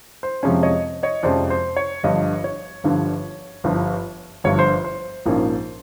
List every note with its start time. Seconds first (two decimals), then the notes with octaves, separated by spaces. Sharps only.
0.23 C5
0.43 F2 C3 F3 G#3 C#4 C#5
0.63 C#5 D#5
1.03 C#5 D#5
1.23 F2 C3 F3 G#3 C#4 C5 D5
1.50 C5
1.76 C#5
2.04 G1 G2 D3 F3 C#5 D#5
2.44 C#5
2.84 G1 G2 D3 F3
3.64 G1 G2 D3 F3
4.44 G1 G2 D3 F3 C#5
4.59 C5
4.85 C5
5.26 A#1 G#2 F3 A#3 C#4